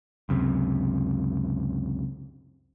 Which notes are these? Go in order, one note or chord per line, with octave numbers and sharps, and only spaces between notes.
C#2 F#2 C3